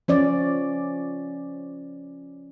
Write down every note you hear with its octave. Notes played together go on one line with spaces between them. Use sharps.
F3 C#4 D5